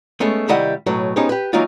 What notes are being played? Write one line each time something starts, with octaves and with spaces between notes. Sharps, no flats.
G#3 A3 B3 C#4
C3 D#3 G3 E4 D#5 F#5
B1 A2 F#3 B4
B3 C#4 D#4 G4 G#4 C5
G4 B4
E3 F#3 A#3 D#4 F4